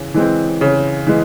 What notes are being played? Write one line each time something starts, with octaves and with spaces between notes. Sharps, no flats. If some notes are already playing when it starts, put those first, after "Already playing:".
Already playing: C#3 E3
E3 G#3 C4
C#3
E3 G#3